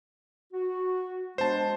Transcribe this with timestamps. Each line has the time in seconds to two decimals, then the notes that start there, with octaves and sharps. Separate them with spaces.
0.53 F#4
1.38 G#3 B3 D4 C5 A5